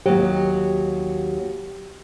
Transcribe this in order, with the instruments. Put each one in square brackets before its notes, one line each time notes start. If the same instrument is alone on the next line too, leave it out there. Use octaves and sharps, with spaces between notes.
[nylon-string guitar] D#2 F#3 [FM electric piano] G4